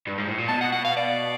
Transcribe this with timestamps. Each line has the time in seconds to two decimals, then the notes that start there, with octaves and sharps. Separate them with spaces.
0.07 G2
0.18 G#2
0.27 A2
0.38 A#2
0.48 B2 A5
0.61 F#5
0.72 F#5
0.85 F5
0.97 D5